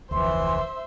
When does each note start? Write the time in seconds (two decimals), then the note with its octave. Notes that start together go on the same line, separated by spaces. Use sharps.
0.11 F1 D2 E3 C5 E5 C6